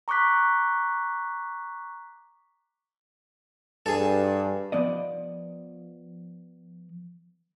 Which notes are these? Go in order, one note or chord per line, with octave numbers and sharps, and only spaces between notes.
A#5 C#6 D6 F#6 B6
G2 G#4 A4
F3 B3 D5 D#5